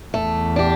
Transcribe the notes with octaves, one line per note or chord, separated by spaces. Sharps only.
E2 A3
D4 G4